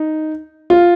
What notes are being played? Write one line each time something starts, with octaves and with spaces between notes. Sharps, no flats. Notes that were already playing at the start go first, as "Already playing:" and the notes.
Already playing: D#4
F4